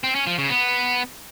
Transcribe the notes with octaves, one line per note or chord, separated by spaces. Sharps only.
C4
C#4
F3
C#3
B3